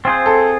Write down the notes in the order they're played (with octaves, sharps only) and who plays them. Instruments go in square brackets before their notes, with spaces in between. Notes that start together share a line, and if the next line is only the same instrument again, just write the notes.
[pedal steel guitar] C4 F4 G#4 C5
[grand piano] A4